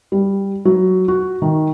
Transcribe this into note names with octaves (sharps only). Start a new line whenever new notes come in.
G3
F#3
F#4
D#3